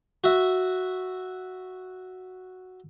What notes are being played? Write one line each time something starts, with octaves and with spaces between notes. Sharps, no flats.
F#4 E5